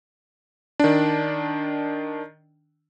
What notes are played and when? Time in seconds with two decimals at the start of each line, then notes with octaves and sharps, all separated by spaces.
0.80 D#3 D4